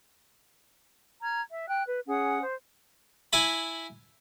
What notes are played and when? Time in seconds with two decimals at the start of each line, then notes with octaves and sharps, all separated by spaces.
1.22 A#5 F6 G#6
1.52 E5
1.68 G5 F#6
1.87 B4
2.08 C#4 G#4 F#5 D#6
2.42 C5
3.33 E4 G#5 A5 B5